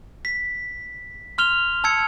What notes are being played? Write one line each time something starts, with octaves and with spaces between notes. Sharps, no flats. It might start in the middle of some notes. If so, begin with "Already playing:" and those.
B6
C6 F6 F7 G7
A5 E6 G#6 C#7